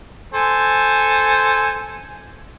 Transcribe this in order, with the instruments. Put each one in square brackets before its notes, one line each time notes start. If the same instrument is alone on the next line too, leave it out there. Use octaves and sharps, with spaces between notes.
[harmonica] A4 C5 G#5